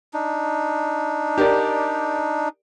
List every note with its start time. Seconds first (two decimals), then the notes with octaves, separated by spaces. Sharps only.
0.14 D4 D#4
1.38 G4 A#4 D5